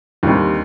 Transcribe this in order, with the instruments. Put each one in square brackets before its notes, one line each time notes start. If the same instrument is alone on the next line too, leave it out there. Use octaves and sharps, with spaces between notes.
[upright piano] D#2 D3 G3 C4